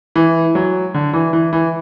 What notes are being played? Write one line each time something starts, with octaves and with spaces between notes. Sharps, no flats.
E3
F#3
D3
E3
E3
E3